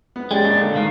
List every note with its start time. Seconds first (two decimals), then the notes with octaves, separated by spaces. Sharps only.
0.16 B3
0.31 G#3 C#4 G4 G#4 D5
0.45 A#1
0.61 D3
0.74 C2 G#2 D#3 F5